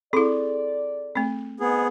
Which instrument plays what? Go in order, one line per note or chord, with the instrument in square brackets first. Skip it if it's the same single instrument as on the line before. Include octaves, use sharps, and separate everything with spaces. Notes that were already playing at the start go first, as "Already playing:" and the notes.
[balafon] C4 E4 [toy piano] G#4 A4 C6 [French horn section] D5
[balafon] A3 C4
[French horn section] G#2 [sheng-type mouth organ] B3 G#4